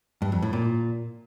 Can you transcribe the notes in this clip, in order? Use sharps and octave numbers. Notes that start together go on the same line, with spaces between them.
G2
F2
A2
A#2